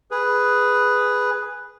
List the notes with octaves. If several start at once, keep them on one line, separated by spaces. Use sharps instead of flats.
G#4 B4